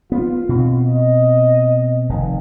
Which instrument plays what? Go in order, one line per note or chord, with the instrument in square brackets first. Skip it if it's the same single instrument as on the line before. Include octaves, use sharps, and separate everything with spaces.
[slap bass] B3 [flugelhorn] F4
[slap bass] B2 C4
[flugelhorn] D#5
[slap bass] F1 D#3